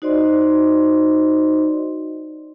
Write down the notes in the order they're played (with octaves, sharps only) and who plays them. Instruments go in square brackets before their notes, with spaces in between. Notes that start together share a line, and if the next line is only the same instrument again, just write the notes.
[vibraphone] D#4 F#4 C5 D5 D#5 C6